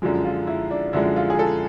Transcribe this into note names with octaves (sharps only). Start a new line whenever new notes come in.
F#2 D3 F3 G#3
F4
E4
D4
F#2 D3 F3 G#3 E4
F4
G#4
A4